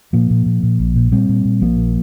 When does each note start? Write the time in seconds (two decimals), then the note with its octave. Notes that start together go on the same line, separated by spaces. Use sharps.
0.13 A#2 F3 A#3
0.30 A#2
0.46 A#2
0.63 A#2
0.79 A#1
0.96 A#2
1.12 A#2 G3 C4
1.29 A#2
1.45 A#2
1.61 A#1 F3 A#3
1.77 A#2